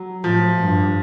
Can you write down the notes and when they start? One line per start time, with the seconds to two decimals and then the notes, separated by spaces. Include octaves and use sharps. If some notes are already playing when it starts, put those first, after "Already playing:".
Already playing: F#3
0.24 A2 F3
0.60 G2